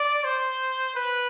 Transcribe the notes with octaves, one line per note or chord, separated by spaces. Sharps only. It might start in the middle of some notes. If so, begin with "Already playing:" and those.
Already playing: D5
C5
B4